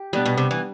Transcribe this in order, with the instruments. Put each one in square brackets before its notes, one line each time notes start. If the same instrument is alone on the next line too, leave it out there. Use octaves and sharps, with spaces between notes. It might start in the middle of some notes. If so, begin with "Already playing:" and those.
Already playing: [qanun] G4
[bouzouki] B2 [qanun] G3 B3 D4
[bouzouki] B2
C3
E3